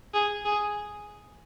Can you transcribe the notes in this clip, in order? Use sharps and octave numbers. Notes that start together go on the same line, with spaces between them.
G#4
G#4